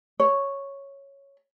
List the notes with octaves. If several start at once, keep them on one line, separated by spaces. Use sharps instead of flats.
C#5